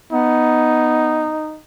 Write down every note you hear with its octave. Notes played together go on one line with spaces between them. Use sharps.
B3 D#4